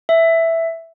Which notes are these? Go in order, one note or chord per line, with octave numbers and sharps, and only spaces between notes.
E5